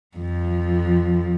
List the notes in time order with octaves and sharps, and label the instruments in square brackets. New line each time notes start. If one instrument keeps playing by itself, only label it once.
[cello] F2 F3